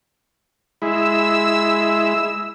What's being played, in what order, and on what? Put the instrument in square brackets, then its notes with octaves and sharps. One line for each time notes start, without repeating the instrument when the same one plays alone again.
[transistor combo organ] G#3 E4 [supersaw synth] E6